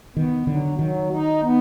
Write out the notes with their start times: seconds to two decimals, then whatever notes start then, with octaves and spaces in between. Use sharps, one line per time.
0.16 D#3 B3
0.47 D3 F#3
0.79 D#3 F#3
1.11 D#4
1.43 B3